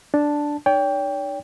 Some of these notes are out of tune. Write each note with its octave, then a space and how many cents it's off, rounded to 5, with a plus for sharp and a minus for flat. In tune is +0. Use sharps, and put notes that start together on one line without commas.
D4 +0 A5 +0
D#4 -40 C#5 +45 G5 +10